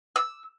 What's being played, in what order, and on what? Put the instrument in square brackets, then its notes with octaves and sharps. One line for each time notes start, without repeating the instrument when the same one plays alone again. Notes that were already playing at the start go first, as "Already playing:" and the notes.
[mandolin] E6